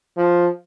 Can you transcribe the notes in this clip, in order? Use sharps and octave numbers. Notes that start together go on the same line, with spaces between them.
F3